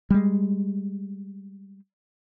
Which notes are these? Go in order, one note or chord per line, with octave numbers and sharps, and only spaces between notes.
G3 G#3